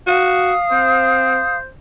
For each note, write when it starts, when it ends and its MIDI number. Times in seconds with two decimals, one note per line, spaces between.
0.07 0.53 66
0.07 1.57 77
0.07 1.57 87
0.71 1.40 60
0.71 1.67 72